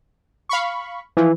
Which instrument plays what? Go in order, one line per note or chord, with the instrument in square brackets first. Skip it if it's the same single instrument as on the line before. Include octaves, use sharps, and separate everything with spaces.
[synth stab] F5 B5 C#6
[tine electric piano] E3 [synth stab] F3